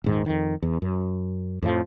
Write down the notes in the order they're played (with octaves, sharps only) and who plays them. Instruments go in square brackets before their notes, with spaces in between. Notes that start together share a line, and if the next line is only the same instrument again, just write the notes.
[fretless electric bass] D#1 G#2 D#3
F2 D#3
E2
F#2
F2 A2 F3